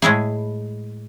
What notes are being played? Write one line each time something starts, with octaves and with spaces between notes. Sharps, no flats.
A2 G#3 E4 G#4